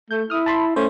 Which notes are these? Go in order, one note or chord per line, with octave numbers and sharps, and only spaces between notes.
A3 G6
E4 D#6 F6
A5 B5 C6
A3 C#4 C5